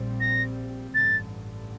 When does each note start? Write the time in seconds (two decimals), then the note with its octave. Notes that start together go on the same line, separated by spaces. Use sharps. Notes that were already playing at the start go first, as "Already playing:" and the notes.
Already playing: A#1 A#2 G3 C4
0.20 A#6
0.94 A1 G2 D3 A6